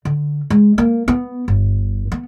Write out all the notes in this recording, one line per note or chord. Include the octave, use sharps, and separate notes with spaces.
D3
G#3
A#3
B3
G1
B3